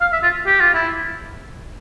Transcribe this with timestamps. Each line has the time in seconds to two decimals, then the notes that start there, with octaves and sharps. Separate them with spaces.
0.01 F5
0.13 E5
0.23 F4
0.46 G4
0.60 F4
0.74 E4